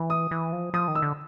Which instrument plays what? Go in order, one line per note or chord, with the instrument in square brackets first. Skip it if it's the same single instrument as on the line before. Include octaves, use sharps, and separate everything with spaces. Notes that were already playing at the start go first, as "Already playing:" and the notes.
Already playing: [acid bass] E3
[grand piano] D#6
[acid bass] E3
F3
[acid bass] F3 [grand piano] D#6
[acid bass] D#3
[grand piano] E6
[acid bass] D3